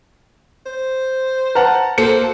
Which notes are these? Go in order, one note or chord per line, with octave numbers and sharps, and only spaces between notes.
C5
B4 F#5 A5 A#5
A#3 F#4 A4 C5 C#7